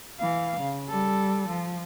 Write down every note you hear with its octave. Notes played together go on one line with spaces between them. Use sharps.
E3 F5
C#3
G3 A4
F3